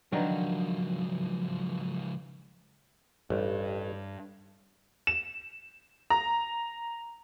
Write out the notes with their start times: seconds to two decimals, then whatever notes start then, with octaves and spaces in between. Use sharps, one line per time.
0.12 C#2 D3 D#3 F3 F#3 A#4 B4
3.30 A1 G2 G3
5.07 E7
6.10 A#5